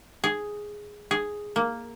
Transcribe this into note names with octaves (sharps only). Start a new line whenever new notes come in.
G#4
G#4
A#3